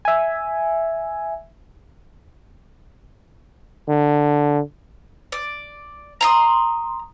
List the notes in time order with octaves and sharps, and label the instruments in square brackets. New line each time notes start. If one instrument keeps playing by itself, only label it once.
[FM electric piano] E5 G#5
[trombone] D3
[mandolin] D5
A#5 C6 D#6